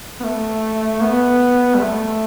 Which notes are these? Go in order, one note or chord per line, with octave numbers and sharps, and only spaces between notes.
B3
A3
B3
G3
A3